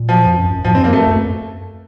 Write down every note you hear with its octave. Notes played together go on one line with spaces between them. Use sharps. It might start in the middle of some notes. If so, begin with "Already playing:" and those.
Already playing: A#2
F3
F2
F#2
F#2
A2 F3
C4
F#2 A#3
A3
F#2